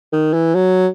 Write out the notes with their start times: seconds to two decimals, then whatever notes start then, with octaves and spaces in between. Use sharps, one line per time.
0.13 D#3
0.33 E3
0.55 F#3